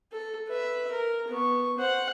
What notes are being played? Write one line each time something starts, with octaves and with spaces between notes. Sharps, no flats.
A4
B4 E5
A#4
B3 C#6
C5 F#5